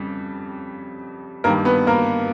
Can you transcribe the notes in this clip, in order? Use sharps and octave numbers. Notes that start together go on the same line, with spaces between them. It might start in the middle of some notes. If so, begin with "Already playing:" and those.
Already playing: F2 C#3 G3
G2 D#3 G3 A#3 A#4
B3 B4
A#3 A#4